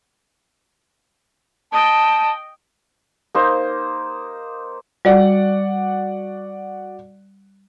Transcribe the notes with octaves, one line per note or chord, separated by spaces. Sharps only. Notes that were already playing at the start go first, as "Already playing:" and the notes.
D#5 G5 A5
A#3 D#4 C5
G3 F#4 D5 F#5